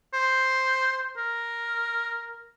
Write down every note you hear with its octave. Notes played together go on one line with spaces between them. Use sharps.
C5
A#4